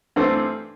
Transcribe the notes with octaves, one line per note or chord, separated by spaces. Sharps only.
G2 E3 A3 C4